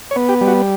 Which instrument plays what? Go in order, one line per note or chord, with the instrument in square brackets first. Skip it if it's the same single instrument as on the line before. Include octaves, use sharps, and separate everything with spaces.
[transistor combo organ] C#5
B3
G4
G3
F#4